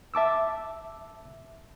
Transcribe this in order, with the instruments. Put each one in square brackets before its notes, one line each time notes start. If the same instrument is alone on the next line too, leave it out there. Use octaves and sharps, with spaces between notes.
[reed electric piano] E5 A5 D6 E6